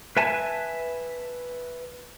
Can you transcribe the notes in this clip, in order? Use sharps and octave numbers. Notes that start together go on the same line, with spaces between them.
B4 E5 G#5 A5